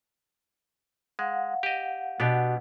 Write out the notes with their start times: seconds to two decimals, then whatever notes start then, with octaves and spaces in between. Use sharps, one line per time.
1.19 G#3 F5 F#5
1.63 G4 D#5
2.20 B2 B3 D4 F#4 G4 F#5